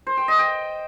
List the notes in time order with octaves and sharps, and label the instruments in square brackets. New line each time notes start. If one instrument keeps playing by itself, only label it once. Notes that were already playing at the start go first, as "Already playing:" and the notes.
[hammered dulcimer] C5
G5
D#5
G5